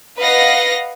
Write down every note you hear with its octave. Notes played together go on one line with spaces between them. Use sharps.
B4 D#5 F5 F#5 A#6